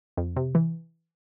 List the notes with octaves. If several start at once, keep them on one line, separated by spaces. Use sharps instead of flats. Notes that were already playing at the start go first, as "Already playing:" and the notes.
F2
C3
E3